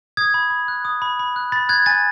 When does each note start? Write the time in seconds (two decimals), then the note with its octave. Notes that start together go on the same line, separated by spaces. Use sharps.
0.17 D#6 G#6
0.34 B5
0.51 B5
0.68 F#6
0.85 D#6
1.02 B5
1.19 B5
1.36 F#6
1.52 B5 A6
1.69 F#6 G#6
1.86 G#5 A6